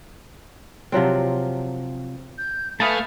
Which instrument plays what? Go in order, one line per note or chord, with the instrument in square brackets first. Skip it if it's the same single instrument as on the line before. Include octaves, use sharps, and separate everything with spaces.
[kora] C3 F3 F#3 C4
[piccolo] G6
[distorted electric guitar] A3 [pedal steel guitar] B4 G#5 A5 [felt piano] E5 B5 D#6 [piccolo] F5